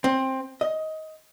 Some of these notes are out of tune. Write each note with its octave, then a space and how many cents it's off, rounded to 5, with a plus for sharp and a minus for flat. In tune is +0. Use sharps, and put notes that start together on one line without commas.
C4 +15
D#5 +15